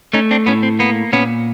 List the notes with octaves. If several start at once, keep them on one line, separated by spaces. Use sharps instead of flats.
A3 C#4 D#4
C4 D4
A2 B3 C#4
C4
A#3 B3
A#2 B3 C#4